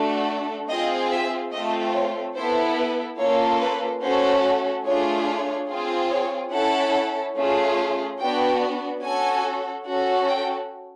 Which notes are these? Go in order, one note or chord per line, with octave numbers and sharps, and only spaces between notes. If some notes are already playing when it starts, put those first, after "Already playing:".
Already playing: A3 D4 F#4 A4
C4 F4 G#4 D#5
E5
A3 C4 F4 D#5
C#5
B3 E4 A4 C5
B4
A#3 C#4 F4 A4 C#5
B4
A3 C#4 F#4 A4 C5
A3 D4 F4 G#4 C#5
C#5
C4 F4 G#4
C#5
C#4 E4 A4 F#5
A3 C#4 F4 G#4
B3 D4 F#4 G5
C#4 F#4 A4 G#5
C#4 F#4 A4
G5